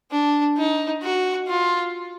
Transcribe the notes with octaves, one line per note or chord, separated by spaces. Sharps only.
D4
D#4
F#4
F4